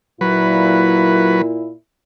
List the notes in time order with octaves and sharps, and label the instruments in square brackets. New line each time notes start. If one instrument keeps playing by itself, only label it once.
[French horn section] A#2 E4 [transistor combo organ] F#3 B4